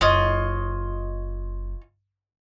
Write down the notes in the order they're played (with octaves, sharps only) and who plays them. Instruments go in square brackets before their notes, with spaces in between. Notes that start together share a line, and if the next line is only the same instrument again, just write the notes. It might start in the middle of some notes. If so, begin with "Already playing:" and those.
[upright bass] F#1 [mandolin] F4 C#5 D#5